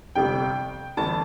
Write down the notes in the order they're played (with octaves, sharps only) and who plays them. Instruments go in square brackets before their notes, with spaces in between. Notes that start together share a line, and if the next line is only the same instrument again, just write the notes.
[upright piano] G1 F2 C3 G5
G1 F2 E3 A5